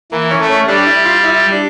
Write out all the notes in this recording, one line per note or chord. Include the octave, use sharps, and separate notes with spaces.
E3 A#3
C#4
A3
C#4
G3 D4
E4
F4
E4
D4